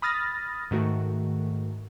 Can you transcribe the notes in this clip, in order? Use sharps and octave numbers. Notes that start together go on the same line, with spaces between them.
B5 D#6 F6 A6 A#6
G#2 D#3 A3 F#4